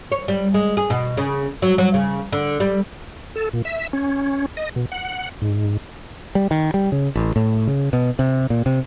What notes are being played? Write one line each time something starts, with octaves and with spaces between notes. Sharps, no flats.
C#5
G3
G#3
G#4
B2
C#3
F#3
F#3
C#3
D3
G3
A4
A#2
E5
C#4
D#5
B2
F#5
G#2
G3
D#3
G3
C#3
A1
A2
C#3
B2
C3
A#2
C3